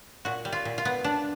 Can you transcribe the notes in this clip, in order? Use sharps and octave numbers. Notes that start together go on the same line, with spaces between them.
A#2 F#4
G3
F4
A#2
F4
B3
D4